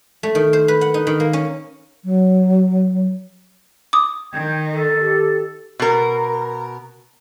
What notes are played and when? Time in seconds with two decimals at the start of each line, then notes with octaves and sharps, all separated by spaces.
0.23 A3
0.35 D#3
0.53 C5
0.68 B4
0.81 F#5
0.94 D#4
1.07 D#3
1.20 A#3
1.33 C#4
2.05 F#3
3.93 D6 D#6
4.33 D#3 G5 G6 G#6
4.72 A4
5.00 G4
5.80 B2 A#4